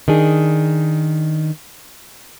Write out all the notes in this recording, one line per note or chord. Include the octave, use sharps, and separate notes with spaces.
D#3 D4 G#4